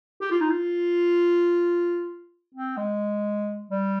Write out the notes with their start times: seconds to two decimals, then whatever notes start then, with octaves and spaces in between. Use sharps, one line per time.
0.21 G4
0.31 F4
0.41 D#4
0.50 F4
2.54 C4
2.77 G#3
3.71 G3